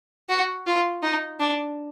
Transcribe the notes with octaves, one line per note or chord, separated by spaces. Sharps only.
F#4
F4
D#4
D4